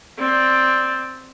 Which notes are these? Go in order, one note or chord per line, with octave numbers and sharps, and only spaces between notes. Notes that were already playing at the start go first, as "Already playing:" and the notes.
C4 D5